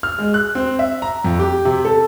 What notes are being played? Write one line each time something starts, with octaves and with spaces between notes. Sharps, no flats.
F6
G#3
F#6
C4
E5
A#5
F2
G4
C3
A4